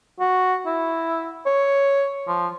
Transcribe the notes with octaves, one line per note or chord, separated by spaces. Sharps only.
F#4
E4
C#5
F3